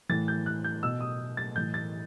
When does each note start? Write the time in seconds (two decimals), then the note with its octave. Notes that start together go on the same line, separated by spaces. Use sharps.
0.09 A2 E3 A6
0.28 G6
0.46 F#6
0.64 G6
0.83 B2 E6
1.01 D#6
1.37 A6
1.55 A2 E3 G6
1.74 A6